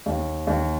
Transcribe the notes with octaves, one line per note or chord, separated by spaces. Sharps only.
D#2
D#2